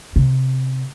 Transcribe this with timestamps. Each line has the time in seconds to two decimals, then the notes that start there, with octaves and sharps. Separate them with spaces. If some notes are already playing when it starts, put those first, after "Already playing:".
0.16 C3